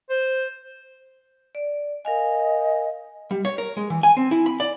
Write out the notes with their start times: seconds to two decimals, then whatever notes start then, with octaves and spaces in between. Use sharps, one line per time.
0.10 C5
1.55 D5
2.05 A#4 D#5 F5 G#5
3.31 G3
3.45 C#5
3.58 A#4
3.77 G#3
3.90 E3
4.03 G#5
4.17 C4
4.31 E4
4.46 B5
4.60 D5